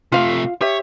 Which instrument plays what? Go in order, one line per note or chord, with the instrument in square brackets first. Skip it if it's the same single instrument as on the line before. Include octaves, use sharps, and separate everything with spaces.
[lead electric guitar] C3 A3 [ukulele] F4 F5
[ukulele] G4 E5 [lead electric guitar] C#5